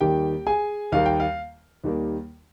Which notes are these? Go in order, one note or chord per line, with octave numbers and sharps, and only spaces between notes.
D#2 D#3 G3 A#3 G4 G5
G#4 G#5
D#2 D#3 G3 A#3 F5
G5
F5
D#2 D#3 G3 A#3